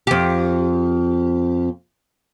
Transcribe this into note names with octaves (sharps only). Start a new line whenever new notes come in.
F2 G4